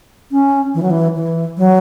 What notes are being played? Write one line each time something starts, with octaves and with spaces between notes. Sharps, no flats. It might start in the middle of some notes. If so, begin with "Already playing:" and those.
C#4
E3
F#3
E3
E3
F#3